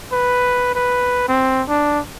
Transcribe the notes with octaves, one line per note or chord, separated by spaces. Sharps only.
B4
B4
C4
D4